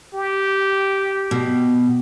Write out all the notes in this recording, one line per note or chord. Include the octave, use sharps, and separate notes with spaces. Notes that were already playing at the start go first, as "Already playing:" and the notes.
G4
B2